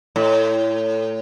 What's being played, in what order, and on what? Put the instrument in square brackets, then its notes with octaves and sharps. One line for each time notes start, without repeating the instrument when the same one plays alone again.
[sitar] A2